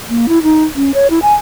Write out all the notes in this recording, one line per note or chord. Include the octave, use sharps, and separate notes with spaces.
A#3
E4
D#4
C#4
C#5
E4
G#5